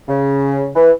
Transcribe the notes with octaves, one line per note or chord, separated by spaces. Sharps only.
C#3
E3